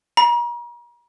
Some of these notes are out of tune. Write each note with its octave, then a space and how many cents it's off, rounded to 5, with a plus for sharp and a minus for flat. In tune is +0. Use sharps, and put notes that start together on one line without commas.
A#5 +40